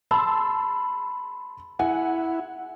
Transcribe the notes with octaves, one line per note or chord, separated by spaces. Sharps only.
A5 B5 C6 E6
E4 F#5 G#5